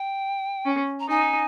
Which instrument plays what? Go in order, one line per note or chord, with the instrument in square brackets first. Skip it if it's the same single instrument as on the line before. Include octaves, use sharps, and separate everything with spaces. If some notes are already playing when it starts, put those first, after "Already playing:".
Already playing: [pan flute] G5
[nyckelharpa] C#4
[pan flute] A#5
[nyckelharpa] D#4 [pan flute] G#5